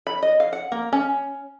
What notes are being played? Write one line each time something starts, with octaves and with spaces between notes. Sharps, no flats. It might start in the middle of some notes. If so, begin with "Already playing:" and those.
B5
D#5
F5
F#5
A#3
C#4